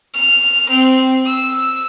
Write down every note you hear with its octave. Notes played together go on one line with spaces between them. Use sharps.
F6
C4
E6